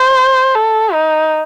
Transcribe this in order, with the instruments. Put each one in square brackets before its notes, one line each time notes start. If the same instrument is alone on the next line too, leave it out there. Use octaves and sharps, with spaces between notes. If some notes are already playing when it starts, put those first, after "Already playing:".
Already playing: [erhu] C5
A4
D#4